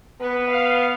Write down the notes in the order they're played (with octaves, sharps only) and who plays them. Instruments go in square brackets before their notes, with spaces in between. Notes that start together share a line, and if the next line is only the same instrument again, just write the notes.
[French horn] B3 [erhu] B4
[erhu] F5